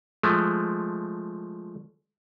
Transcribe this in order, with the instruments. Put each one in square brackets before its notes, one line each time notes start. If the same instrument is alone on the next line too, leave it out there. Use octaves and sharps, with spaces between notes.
[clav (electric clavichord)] F3 G#3 A3